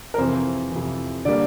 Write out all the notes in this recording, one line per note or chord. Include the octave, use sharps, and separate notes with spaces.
A#4
F2 C3 E3 C5
F2 C3 E3
D3 G3 A#3 D5